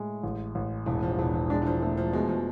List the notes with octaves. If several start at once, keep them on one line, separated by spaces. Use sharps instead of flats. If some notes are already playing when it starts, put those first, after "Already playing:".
Already playing: A2 G#3
A1
A1
E1 E3
F3
E1 E3
F3
G#3 D4
E3
F3
F3 A3
F3
B2 G#3
F3